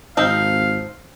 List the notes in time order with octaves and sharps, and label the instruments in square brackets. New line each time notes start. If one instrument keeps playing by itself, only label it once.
[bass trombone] G#1 [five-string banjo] F3 C4 D#4 [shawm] F5